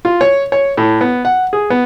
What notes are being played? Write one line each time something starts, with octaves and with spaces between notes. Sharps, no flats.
F4
C#5
C#5
A2
B3
F#5
G#4
B3